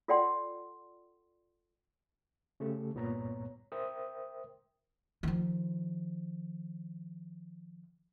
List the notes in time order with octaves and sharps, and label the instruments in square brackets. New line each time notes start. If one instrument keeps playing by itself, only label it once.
[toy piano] F4 A4 D5 F#5 G5 C6
[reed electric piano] C#3 A3 G4 A4
C2 G2 A#2 B3 C#5 A#5
A#4 C5 E5 G5 D#6
[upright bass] D#3 F3